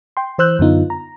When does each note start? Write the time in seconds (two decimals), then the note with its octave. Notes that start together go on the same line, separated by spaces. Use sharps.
0.17 G5 C6
0.38 E3 C5 E6 F#6 G6
0.59 F#2 D3 B3 D#4 F4
0.90 A#5